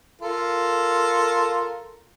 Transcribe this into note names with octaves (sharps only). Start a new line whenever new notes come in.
F4 A4 A#4